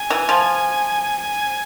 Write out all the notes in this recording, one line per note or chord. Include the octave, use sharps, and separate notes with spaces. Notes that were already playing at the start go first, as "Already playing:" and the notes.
Already playing: G#5
E3
F3
G#5